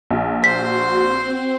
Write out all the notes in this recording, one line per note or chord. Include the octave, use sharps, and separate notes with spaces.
A#1
F#4 C5 C6 B6
C4